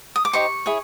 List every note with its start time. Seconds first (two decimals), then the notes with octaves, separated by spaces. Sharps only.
0.16 D#6
0.25 D6
0.33 D#4 G4 C5 C#6
0.66 E4 G#4 C#5